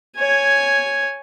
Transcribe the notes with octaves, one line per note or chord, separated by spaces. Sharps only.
C#5 G#5